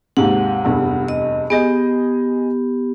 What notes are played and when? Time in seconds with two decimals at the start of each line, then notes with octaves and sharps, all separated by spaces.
0.17 D#2 G#2 C3 F#5
0.65 F1 E2 G2
1.08 D#5
1.50 B3 G4 G#4 D#5